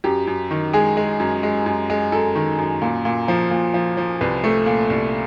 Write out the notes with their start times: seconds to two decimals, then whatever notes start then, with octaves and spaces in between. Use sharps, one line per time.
0.04 F#2 G4
0.27 F#2
0.51 D#3
0.73 G#3 G#4
0.97 G#3
1.20 F#2
1.43 G#3
1.66 F#2
1.90 G#3
2.12 F#2 A4
2.35 D#3
2.58 F#2
2.82 A#2
3.05 A#2
3.28 F3
3.51 A#2
3.74 F3
3.97 F3
4.21 C2 B4
4.44 A3
4.66 A#2
4.90 C2